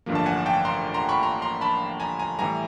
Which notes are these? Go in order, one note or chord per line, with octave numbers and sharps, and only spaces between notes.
A1 G2 D3 F3 A#3
A5
F#5 G#5
G5 A5
A#5 C6
A#5 C6
B5 C#6
A#5 C6
A#5 C6
A5 B5
G#5 A#5
G#5 A#5
A2 E3 G3 G#5 A#5